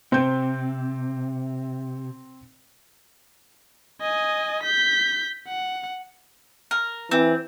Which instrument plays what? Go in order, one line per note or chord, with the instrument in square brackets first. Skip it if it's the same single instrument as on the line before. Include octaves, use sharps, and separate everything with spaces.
[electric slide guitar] C3 [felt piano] C4 G6
[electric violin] D#5 G#5
G6 B6
F#5
[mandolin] A#4
[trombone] E3 [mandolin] C4